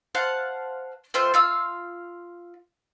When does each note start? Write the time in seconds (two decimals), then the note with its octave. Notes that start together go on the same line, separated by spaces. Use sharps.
0.15 C5 F5 F#5 A5
1.14 A3 F4 C5 G5
1.34 F4 F5 E6